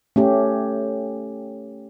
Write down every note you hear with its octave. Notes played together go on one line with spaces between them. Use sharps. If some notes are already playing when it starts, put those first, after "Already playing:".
A3 C#4 G4